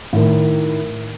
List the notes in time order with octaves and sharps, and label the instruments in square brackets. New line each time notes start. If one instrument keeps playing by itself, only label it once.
[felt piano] A2 D#3